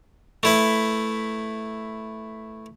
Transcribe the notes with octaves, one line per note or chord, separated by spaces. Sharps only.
A3 E4 B4